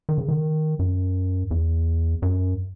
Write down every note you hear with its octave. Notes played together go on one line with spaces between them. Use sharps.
D#3
C#3
D#3
F#2
E2
F#2